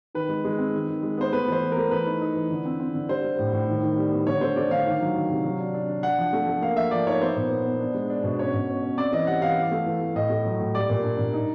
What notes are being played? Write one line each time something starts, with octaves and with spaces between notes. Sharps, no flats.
D#3 B4
G#3
G#3
C4
D#3
D#3
G#3
B3 C5
A3 B4
E3 C5
E3
A3 A#4
E3 B4
D#4
D#4
E3
D3
C4
C4
D3
G3 C5
G3
A2
A2
D#3
D#3
G3
B3
D3 C#5
A3 C5
A3 D5
D3 F5
D#3
F#3
D#3
C3
F#3
D4
D4
D4
D4 F#5
F3
A3
A3
A#3 F5
F3 E5
F3 D5
D#4 C#5
B3 C5
A#2
B3
B3
D4
G#3
D4
B2
C#4 C#5
B2
C#4
C#4
C4 D5
E3 D#5
G3 F#5
E3 F5
E3
A3
E3
A3
A2 D#5
A3
F#3
A2
G3 D5
A#2
D4
A#2
D#4